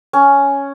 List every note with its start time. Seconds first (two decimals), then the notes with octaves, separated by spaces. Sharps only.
0.13 C#4